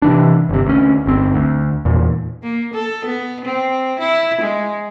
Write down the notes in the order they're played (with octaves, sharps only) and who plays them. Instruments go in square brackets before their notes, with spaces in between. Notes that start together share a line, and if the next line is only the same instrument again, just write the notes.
[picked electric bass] C3 E3 D4
G1 C3
D2 C#4
G1 C4
D2
E2 A#2
[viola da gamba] A#3
A4
B3
C4
E4
G#3